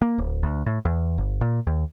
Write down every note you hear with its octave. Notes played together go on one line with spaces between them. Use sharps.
A#3
D1
D2
A2
E2
G1
A#2
D#2